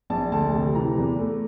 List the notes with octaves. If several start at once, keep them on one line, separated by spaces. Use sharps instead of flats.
A#1 A5
D2 A5
C3
E3 A#5
E2
A3